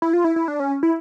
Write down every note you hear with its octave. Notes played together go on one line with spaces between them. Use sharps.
E4
F4
E4
E4
D4
C#4
E4